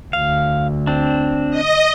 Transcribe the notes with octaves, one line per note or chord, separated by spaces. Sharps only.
D2 F5
C4 D4
D#5